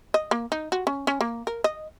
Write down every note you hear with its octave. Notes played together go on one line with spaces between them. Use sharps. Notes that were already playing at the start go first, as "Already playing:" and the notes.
D#5
A#3
D#4
F#4
C#4
C#4
A#3
A#4
D#5